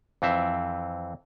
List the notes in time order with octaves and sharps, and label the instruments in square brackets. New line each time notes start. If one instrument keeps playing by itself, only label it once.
[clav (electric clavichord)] F2 E3 C4 E5